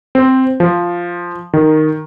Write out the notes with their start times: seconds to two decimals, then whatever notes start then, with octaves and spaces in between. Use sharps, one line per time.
0.15 C4
0.60 F3
1.53 D#3